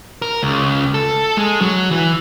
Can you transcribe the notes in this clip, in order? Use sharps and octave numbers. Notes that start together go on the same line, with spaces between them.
A#4
C#2
A4
G#3
F#3
E3